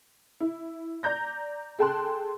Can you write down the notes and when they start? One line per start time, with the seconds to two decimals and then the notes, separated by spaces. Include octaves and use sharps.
0.40 E4
1.03 D5 A#5 G6 A#6
1.79 G#4 A4 G5 A5 C6 F#6